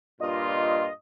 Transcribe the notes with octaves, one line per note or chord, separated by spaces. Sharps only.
G2 A#2 F4 D#5